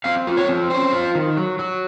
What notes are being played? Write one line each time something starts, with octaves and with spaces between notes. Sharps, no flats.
C4 F5
F4
C#5
C4
C#4 C5
F4
D#3
F#3
F#3